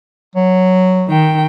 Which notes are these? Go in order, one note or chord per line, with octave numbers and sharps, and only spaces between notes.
F#3
D#3 G5